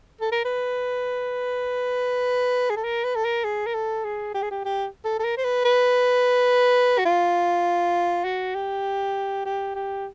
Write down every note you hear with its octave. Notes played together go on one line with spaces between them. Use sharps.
A4
A#4
B4
G#4
A4
A#4
B4
A4
A#4
G#4
A#4
A4
G#4
G4
G#4
G4
G4
A4
A4
A#4
C5
B4
B4
F#4
F4
F#4
G4
G4
G4